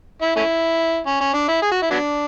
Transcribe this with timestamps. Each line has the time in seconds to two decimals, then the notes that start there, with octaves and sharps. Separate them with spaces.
0.22 E4
0.36 A3 C#4 E4
1.07 C#4
1.21 C#4
1.34 D4
1.49 E4
1.62 G#4
1.72 F#4
1.82 E4
1.91 F#3 B3 D4